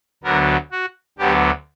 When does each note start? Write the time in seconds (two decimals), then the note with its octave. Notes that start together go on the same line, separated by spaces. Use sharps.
0.24 D2 D3 F#3 B3 A#4
0.72 F#4
1.18 D2 D3 F#3 B3 G4